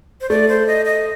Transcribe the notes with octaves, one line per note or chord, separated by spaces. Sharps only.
C5
A3 D5
C5
D#5
D#5